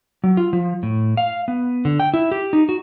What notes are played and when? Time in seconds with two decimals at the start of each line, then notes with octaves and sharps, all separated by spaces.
0.24 F#3
0.37 F4
0.53 F3
0.83 A2
1.17 F5
1.48 B3
1.85 D3
2.00 G5
2.14 E4
2.31 G4
2.53 D#4
2.69 F#4